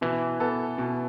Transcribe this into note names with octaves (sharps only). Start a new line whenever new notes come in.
B2 E3
B3 A4
B2